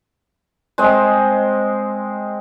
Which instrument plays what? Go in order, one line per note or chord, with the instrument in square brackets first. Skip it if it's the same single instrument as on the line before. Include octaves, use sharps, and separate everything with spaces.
[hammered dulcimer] G#3 C4 D#5